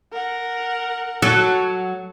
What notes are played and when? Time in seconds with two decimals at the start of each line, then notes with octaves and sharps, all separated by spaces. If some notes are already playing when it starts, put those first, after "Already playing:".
0.12 A#4 F#5
1.22 F#3 A4